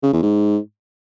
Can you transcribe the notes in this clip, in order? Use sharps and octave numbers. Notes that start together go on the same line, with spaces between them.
C#3
E2
G#2